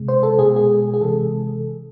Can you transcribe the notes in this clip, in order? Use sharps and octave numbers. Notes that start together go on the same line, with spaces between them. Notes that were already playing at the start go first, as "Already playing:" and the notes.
Already playing: C3 G#3
C5
A4
B2 G#3 G#4
G#4
G#4
C3 E3 G#3 A4